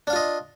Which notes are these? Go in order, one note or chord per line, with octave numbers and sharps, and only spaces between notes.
D4 F4 D#5 F5